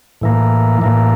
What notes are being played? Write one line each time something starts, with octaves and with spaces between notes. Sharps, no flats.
A2 E3 A#3
A2 E3 A#3